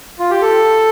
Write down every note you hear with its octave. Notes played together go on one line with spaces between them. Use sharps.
F4
G4
A4